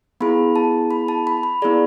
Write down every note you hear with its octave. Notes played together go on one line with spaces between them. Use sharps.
B3 E4 G#4 B5
A5
B5
A5
B5
B5
B3 E4 G#4 D5